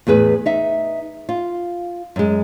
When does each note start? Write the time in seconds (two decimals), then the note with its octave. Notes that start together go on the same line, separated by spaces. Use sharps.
0.07 E2 A2 G#4 B4
0.46 D#4 E5
1.29 F4
2.16 F#2 G#3